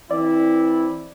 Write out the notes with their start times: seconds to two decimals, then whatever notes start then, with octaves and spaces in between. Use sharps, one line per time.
0.11 E3 C4 E4 D5